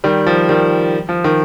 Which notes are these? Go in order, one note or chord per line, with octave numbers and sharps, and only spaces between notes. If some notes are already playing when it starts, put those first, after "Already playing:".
D#3 G3
F3
D#3 G3
F3
D#3